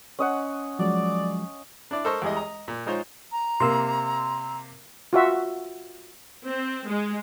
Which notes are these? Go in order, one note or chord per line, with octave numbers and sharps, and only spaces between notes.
C#4 D#5 F#5
F3 F#3 G#3 D5
D4 E4 D5
A4 A#4 C5 D#5 C#6
E2 G3 G#3 E4 G#4 D#5
D#5 A#5
A#2
G#3 D#4 F4 C5 C#5
A#5
C3 A#3 C6 E6
F4 F#4 E5
C4
G#3